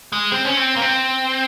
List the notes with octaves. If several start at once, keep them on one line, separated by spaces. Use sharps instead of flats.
G#3
C4
C#4
C4
A#3
C4